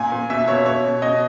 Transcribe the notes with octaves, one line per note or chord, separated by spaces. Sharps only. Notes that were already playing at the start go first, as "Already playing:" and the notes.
Already playing: A#2 G#5
A#2
B2 E5
B2 C#5
B2 C#5
B2
B2 D#5